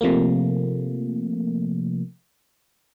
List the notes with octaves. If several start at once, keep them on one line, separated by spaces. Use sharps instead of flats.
C3 F3 A3 A#3